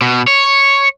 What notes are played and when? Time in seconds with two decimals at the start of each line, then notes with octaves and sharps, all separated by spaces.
0.01 B2
0.28 C#5